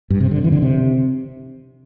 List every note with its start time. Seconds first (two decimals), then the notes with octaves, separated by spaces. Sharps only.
0.10 G2
0.20 C3
0.31 D3
0.44 E3
0.52 D3
0.62 C3